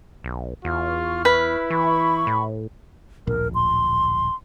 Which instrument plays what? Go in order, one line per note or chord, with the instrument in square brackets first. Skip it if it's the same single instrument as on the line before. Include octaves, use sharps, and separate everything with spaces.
[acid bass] B1
[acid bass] E2 [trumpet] F4 [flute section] C#6 F6
[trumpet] E4 [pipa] B4
[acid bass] E3 [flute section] B5 C#6
[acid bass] A2
[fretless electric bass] D1 A#1 [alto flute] A#4
[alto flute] C6